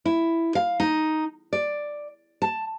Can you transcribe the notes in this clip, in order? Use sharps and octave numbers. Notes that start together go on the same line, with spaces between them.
E4
F5
D#4
D5
A5